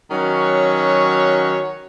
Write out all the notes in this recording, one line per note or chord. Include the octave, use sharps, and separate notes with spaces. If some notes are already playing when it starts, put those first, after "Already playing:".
D#3 F#3 C#4 F#4 C#5